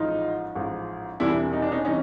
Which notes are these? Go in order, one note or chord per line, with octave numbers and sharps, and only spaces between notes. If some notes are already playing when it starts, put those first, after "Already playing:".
Already playing: A1 G#2 F3 D#4 F4
A1 G#2 F3
E1 E2 C3 E3 G3 D4 E4
D#4
D4
C#4 D#4
C3 E3 G3 C#4 D#4